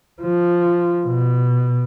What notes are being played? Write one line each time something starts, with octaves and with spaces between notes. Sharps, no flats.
F3
B2